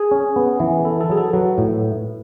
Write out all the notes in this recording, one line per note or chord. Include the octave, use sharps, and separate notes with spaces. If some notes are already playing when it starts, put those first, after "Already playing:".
Already playing: G#4
C#4
B3
E3
E4 A4
A4
F#3 G#4
A4
F#3 B4
A2